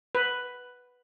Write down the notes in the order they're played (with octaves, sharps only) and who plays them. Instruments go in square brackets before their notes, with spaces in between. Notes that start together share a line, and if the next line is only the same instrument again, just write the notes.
[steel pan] B4